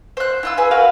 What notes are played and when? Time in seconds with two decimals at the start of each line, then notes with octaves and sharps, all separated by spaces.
0.17 C5 F#6
0.43 E4 F4 E6
0.58 G#4 B4 G#5
0.71 F#4 A#4 B4 F5